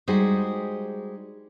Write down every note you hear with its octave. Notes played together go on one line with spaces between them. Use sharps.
G3 G#3 D#4 F#4 G#4 C5